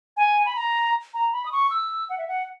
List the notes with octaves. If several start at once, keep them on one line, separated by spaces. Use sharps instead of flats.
G#5
B5
A#5
A#5
B5
D#6
C#6
E6
F#5
E5
F#5